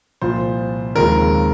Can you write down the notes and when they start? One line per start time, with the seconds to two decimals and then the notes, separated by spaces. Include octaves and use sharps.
0.22 C2 A#2 F3 C5
0.96 D#2 C#3 F3 G#3 C4 A#4